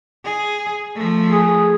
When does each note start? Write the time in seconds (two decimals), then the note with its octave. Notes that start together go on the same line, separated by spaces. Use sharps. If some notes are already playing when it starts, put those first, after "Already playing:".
0.25 G#4
0.95 F3 A3
1.29 G#4